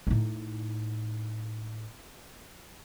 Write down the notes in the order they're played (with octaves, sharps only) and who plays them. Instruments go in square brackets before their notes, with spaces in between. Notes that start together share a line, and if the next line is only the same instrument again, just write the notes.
[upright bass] A2 D#4